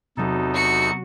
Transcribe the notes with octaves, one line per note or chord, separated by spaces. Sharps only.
E2 C3 F#3 D#4 A4
F#4 C#7